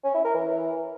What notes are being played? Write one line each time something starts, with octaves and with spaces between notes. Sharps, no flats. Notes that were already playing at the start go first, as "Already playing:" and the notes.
C#4
E4
A#4
E3